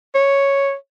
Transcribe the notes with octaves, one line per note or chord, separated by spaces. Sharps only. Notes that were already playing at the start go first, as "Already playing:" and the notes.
C#5